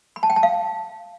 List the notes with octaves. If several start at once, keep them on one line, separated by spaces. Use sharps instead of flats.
B5
A5
G5
A5
F5